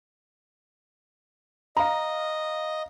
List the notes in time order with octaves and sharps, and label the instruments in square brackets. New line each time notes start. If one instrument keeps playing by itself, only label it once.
[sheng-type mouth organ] D#5 [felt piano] F5 A#5